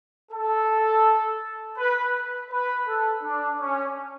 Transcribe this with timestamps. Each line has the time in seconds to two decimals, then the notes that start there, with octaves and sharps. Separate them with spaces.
0.32 A4
1.78 B4
2.51 B4
2.88 A4
3.24 D4
3.60 C#4